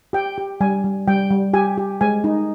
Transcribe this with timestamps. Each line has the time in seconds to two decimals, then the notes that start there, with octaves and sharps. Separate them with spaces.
0.13 G4 G5
0.38 G4
0.61 G3 G#5
0.84 G3
1.08 G3 G5
1.30 G3
1.54 G4 G#5
1.78 G4
2.01 G#3 G#5
2.24 D#4